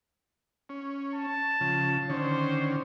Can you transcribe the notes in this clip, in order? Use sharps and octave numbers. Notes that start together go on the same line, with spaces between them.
C#4
A5
C#3 F3
D3 D#3 C#4 C5